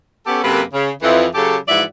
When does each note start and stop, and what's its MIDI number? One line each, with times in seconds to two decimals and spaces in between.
0.26 0.44 59
0.26 0.44 61
0.26 0.44 67
0.26 0.44 69
0.44 0.62 42
0.44 0.62 48
0.44 0.62 58
0.44 0.62 69
0.44 0.62 71
0.73 0.90 49
1.01 1.26 41
1.01 1.26 52
1.35 1.57 49
1.35 1.57 54
1.35 1.57 67
1.35 1.57 69
1.68 1.83 44
1.68 1.83 52
1.68 1.83 53
1.68 1.83 66
1.68 1.83 74
1.68 1.83 76